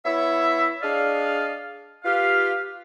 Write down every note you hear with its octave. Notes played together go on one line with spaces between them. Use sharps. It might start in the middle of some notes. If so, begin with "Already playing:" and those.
B3 E4 C#5 E5
D4 G#4 D5 D#5 F5
F4 G4 B4 F5